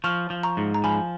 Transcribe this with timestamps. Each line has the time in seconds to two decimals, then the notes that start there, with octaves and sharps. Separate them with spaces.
0.04 F3 C#6 F6
0.30 F3
0.43 A#5 C#6
0.57 G#2
0.74 A#5
0.84 F3 G#5 B5